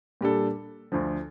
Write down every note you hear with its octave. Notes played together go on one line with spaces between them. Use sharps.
A#2 G3 D4 A4
D2 D3 F3